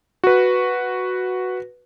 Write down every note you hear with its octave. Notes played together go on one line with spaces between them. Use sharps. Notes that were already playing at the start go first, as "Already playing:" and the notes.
F#4 B4